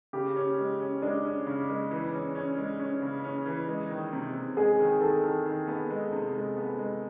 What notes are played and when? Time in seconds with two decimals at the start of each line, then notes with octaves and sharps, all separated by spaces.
0.13 C#3 G4
0.36 C#4
0.58 G#3
0.80 C#4
1.02 G#3 D4
1.25 C#4
1.47 C#3
1.69 G#3
1.91 E3
2.13 C#4
2.35 C#4
2.58 G#3
2.80 C#4
3.02 C#3
3.24 C#4
3.46 E3
3.68 G#3
3.90 D#3
4.13 C3
4.34 C3
4.57 G#3 G#4
4.79 D#3
5.01 D#3 A4
5.24 D#3
5.46 D#3
5.68 B3
5.90 G#3
6.12 C3
6.35 G#3
6.57 B3
6.79 G#3